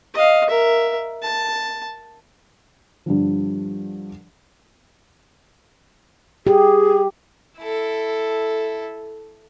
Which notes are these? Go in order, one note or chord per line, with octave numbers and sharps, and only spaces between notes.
D#5 F5
A#4 E5
A5
G2 D3 F3
G4 G#4
E4 A4